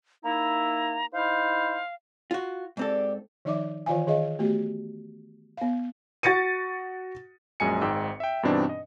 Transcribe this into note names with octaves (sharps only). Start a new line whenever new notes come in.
A#3 D#4 E4 A#5
D#4 E4 C5 F5
F4 F#4
G#2 C4 D4 G4 A4
D#3 F3 D#4 D5 E5 D6
D#3 E3 F4 C5 F5 G#5
D#3 G#4 D#5 F5
A3 B3 F#4 G4
B3 F5
F#4 A6 A#6 C#7 D#7
A#1 F#2 G#3 G#5 C#7
G#1 G#2 G5 E6
E5 G5
G2 B2 E3 C4 D4 D#4
D#5